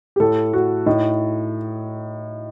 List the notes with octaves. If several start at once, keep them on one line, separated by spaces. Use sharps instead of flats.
G4
A2 A4
F#4
A2 D#4